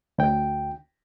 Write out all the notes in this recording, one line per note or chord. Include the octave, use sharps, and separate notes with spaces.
D2 G5